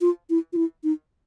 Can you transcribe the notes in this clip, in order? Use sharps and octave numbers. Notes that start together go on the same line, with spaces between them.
F4
E4
F4
E4
D#4